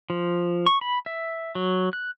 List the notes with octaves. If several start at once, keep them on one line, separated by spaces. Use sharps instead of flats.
F3
C#6
B5
E5
F#3
F#6